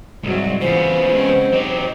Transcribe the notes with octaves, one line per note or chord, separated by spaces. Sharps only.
C2 G#2 F#3
C#3 E3 B3 F4 C5
G#3 C4 C#4
F#3 D#4 G4